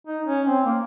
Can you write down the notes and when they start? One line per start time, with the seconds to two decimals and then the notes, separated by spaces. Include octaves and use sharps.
0.07 D#4
0.27 C#4
0.46 C4
0.66 A#3